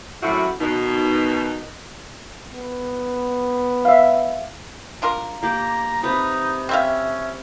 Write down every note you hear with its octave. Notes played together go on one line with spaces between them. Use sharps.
F#2 A2 C3 F#3 E4 F#4
B2 D#3 D#4
B3
E5 F5
D4 F4 A#4
A#3 G4 A#5
C3 D#4 B4
C4 C#4 E5 F5